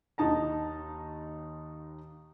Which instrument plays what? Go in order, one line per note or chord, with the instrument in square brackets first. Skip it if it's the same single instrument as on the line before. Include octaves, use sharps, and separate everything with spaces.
[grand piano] D#2 D#3 D#4 A5 A#5